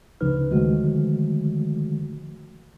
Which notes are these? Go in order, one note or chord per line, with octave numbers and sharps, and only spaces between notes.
D2 C#3 F3 D#4 B4 F6
D3 D#3 F3 G#3 A3 F#4